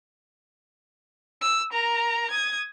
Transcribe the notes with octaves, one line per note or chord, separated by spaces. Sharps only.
E6
A#4 A#5
D#6 G#6